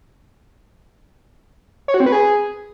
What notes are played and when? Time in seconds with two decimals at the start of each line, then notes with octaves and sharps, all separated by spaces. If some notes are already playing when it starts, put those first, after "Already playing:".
1.88 C#5
1.94 F#4
2.00 C4
2.06 B4
2.12 G#4